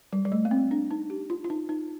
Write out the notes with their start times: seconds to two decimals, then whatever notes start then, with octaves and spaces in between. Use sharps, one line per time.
0.13 G3
0.25 G3
0.32 A3
0.45 A#3
0.51 C4
0.71 D4
0.91 D#4
1.10 G4
1.30 F4
1.44 F4
1.50 D#4
1.69 D#4